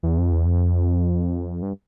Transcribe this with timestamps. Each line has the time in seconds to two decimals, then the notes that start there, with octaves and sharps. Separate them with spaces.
0.03 E2
0.18 F2
0.32 E2
0.46 F2
1.62 G2